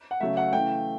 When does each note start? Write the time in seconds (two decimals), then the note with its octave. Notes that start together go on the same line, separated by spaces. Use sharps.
0.11 F#5
0.20 C#3 F#3 A3 E5
0.37 F#5
0.53 C#3 E3 A3 G5